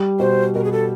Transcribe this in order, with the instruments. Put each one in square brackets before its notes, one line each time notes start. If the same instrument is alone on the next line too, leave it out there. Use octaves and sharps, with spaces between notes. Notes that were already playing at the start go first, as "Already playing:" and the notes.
Already playing: [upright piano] G3
[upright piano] B2 [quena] C5
[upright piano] B2 [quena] A#4
[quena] G#4
A4